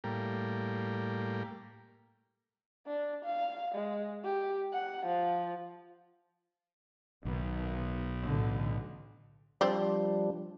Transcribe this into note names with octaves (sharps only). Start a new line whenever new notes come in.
A2 G3 A#3
D4
F5
G#3
G4
F#5
F3
B1 B2 D#3
A1 D3
F3 G3 C4 D4 C5 D5